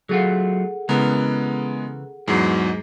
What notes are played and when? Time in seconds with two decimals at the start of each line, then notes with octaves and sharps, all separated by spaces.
0.09 F#3 A3 F4 G#4 A4 F#5
0.89 C#3 E3 G#3 B3 A#4
2.28 E2 G#2 F#3 G#3